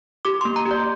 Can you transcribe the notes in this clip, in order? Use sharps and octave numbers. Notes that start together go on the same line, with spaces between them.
G4 D6
A#3 C6
A#5
G4
D5